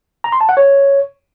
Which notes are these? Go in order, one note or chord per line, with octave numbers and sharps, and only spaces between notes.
A#5
C6
A5
F#5
C#5